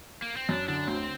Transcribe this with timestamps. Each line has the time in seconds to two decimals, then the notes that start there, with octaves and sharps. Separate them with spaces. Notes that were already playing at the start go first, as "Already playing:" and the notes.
0.22 A#3
0.37 C4
0.49 F#2 D4
0.68 D3 D4
0.87 D2 C4